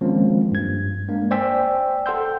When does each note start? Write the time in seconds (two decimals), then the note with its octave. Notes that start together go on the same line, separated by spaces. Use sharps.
0.01 D#3 F3 G#3 A#3 C4 C#4
0.52 G2 G#6
1.08 G#3 A#3 D4
1.31 C5 D5 G5 G#5 E6 B6
2.06 A4 F#5 G5 C6 E6 G6